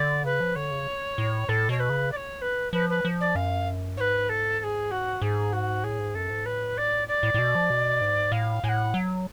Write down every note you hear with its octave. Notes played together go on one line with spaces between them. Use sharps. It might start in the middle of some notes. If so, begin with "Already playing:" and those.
Already playing: D3 D5
C#3 B4
F3
D3 C#5
C#3
A2
A2 A4
B2 C#5
B4
C#3
D5
C#5
B4
F3 B4
B4
F3
D5
F#2 F5
G#2 B4 C#5
A4
A4
G#4
F#4
G#2 G#4
F#4
A2 G#4
G#2
F#2 A4
G#2
A2 B4
D5
D5
A2
A2
B2
F3
B2
G#2
A2 F5
A2 F#5 G#5
F#3